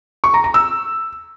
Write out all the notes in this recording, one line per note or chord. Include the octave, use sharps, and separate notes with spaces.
C#6
A#5
A#5
E6